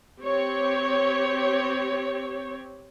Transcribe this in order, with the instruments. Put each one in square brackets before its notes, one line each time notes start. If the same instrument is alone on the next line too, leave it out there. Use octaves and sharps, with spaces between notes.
[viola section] C4 G4 C#5